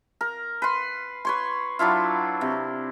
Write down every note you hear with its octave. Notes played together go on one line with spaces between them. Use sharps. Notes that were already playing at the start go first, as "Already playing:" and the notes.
A#4
B4 C6
B4 C#5 C6
F#3 D4 E4 F4
C3